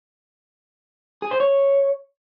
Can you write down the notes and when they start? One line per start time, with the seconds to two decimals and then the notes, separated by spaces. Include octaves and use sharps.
1.22 G#4
1.31 C5
1.40 C#5